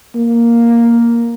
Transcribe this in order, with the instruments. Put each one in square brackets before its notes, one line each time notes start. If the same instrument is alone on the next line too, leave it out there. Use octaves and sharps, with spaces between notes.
[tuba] A#3